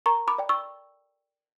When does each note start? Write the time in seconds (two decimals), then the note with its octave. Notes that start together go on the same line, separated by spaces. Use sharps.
0.06 A#4 A#5 C#6
0.28 B5 D6
0.38 D5 G5
0.49 C#6 E6